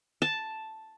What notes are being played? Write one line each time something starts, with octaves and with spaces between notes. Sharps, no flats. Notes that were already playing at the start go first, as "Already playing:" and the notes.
A5